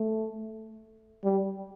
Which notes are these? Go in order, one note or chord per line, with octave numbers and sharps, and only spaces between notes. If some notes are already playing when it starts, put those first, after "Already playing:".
Already playing: A3
G3